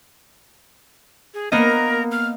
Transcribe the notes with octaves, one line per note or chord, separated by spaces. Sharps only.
G#4
A#3 B3 A#4 D#5
F6